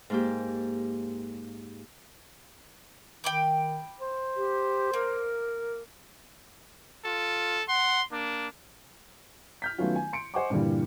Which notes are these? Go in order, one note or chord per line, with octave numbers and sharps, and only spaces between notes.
G#2 A#3 G4
D#3 G5 B5 D6
C5
G4
A#3 A#4
F4 A4
F#5 C6
A#3 D4
F6 G6 B6
D#3 F#3 A3 B3 C#4 F4
G#5
C6 C#7 D7
C5 D#5 F#5 G#5 C#6 D6
G2 A#2 D3 E3 G3